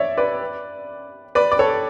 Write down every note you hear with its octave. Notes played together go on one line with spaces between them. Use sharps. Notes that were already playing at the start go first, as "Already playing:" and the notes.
Already playing: C#5 D5 E5
B4 D5
B4 D5
D5
A4 C#5